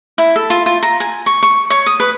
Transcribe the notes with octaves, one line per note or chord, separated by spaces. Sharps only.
E4
A4
F4
F4
A#5
G#5
C#6
C#6
C#5
D#6
B4